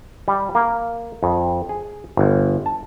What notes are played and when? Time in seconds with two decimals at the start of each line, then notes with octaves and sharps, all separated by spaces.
0.28 G3
0.55 A#3
1.23 F2
1.69 G#4
2.17 G1
2.66 A5